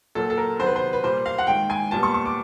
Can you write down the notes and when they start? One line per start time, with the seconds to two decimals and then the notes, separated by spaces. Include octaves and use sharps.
0.15 A#2 F#3 A#3 A4
0.30 A4
0.37 A#4
0.59 C3 D#3 F#3 B3 C5
0.67 B4
0.76 C5
0.93 B4
1.03 A#2 G3 A#3 C5
1.26 F5
1.38 F#5
1.47 G#2 D#3 G#3 G5
1.70 G#5
1.91 A#2 G3 B3 A5
2.03 C#6
2.14 C#6
2.26 D6